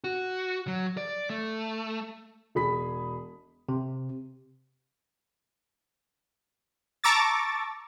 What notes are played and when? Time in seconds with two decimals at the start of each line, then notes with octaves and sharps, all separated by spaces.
0.04 F#4
0.67 F#3
0.97 D5
1.30 A3
2.55 E1 G#4 B5 B6
3.69 C3
7.04 A5 A#5 C#6 D6 E6 A6